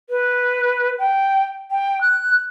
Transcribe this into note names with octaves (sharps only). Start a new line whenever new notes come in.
B4
G5
G5
F#6